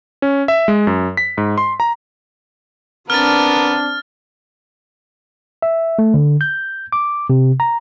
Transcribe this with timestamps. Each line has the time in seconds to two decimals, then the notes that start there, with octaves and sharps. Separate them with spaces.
0.22 C#4
0.48 E5
0.68 G#3
0.87 F#2
1.17 B6
1.38 G#2
1.58 C6
1.80 A#5
3.10 B3 C4 D4 A#4 F6 A6
5.62 E5
5.99 A3
6.14 D3
6.41 G6
6.92 D6
7.30 C3
7.60 A#5